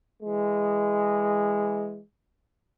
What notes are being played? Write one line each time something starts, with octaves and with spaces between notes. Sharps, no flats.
E3 G#3